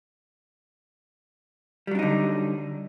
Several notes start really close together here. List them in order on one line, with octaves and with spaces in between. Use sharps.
G3 F#3 D4 D#4 D3